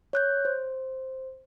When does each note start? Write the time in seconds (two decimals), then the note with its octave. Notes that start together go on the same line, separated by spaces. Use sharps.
0.13 C#5 F#6 G6
0.45 C5